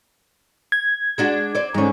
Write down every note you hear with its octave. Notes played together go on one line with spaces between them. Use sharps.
G#6
G#3 D4 F#4
C4 D5
G#2 D3 G#3 C#4